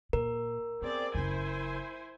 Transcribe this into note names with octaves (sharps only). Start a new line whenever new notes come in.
A#2 A#4
B3 C4 G#4 D5
F#1 C#4 E4 C5 G#5